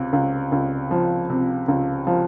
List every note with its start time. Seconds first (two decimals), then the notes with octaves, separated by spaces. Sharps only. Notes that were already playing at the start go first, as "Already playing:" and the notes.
Already playing: C#2 C3
0.13 C#2
0.52 C#2
0.91 F3
1.30 C3
1.68 C#2
2.07 F3